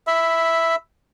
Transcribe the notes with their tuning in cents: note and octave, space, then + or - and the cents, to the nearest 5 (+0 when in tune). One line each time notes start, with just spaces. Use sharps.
E5 +0 B5 +10